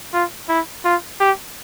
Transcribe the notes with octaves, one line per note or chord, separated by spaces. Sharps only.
F4
E4
F4
G4